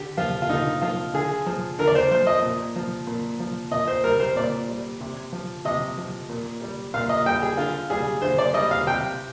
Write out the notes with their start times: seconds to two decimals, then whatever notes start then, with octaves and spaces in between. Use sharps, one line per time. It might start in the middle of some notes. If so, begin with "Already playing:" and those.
Already playing: D3 G4
0.17 F3 F4
0.42 F4
0.49 D3 D#4
0.82 F3 F4
1.14 D3 G#4
1.46 F3
1.79 D3 A#4
1.87 D5
1.95 C5
2.11 F3 C5
2.27 D#5
2.42 A#2
2.76 F3
3.07 A#2
3.40 F3
3.71 A#2 D#5
3.88 C5
4.04 G3 A#4
4.20 C5
4.36 A#2 D5
4.69 G3
5.01 C3
5.32 F3
5.65 C3 D#5
5.97 F3
6.30 A#2
6.62 G3
6.94 A#2 F5
7.09 D#5
7.26 G3 G5
7.42 G#4
7.58 D3 F4
7.90 G3 G#4
8.22 D3 C5
8.38 D5
8.54 G3 D#5
8.71 F5
8.87 C3 G5